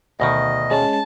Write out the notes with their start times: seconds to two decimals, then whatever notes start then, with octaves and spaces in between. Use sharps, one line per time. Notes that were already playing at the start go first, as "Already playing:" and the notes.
0.20 D2 B2 D#3 D#5
0.71 G#3 C#4 A5